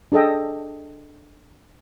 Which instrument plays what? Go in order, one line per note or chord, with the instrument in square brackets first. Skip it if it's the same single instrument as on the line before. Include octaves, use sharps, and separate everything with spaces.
[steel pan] D4 G#4 A4 D#5 G5